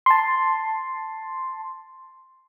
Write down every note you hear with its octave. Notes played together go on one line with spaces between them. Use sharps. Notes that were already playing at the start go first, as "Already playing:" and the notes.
A5 C6